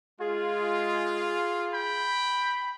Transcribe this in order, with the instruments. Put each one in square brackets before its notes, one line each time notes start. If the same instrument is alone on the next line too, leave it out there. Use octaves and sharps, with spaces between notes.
[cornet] G#3 [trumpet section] F4 [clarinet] G#4
[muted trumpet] G5 [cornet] B5